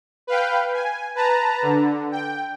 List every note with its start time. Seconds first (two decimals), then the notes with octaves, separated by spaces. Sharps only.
0.27 B4 F5 G5
0.74 G#5
1.15 B4 A5 A#5
1.62 D3
2.12 G5